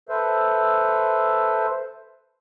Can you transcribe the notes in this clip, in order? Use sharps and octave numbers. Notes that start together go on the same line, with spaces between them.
A4 B4 C5 E5